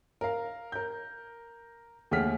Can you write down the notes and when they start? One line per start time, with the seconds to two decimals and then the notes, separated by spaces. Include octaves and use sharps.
0.21 A#4 F5
0.72 A#4 G6
2.11 D#2 A3 G#4 F#5 F6 B6